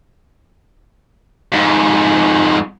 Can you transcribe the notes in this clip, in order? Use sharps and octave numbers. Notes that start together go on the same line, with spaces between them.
F2 G#2